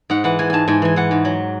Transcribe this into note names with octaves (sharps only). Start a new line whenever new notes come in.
G#2 F#5
E3 F#5
E3 G#5
G#2 G#5 A5
G#2 G#5
E3 G#5
E3 F#5
G#2
F#3